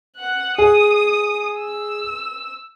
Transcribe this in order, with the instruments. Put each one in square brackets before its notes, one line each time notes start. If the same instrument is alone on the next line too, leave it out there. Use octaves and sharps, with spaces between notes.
[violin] F#5 F#6
[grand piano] G#4 [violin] D#6
[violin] E6